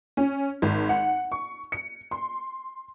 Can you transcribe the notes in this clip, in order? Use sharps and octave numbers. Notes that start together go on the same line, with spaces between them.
C#4
G#1
F#5
C#6
C#7
C6